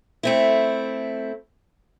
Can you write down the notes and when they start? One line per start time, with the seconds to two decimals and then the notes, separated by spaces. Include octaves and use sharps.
0.23 A3 C4 E4